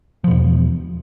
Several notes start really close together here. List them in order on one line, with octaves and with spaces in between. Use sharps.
F3 B2 E2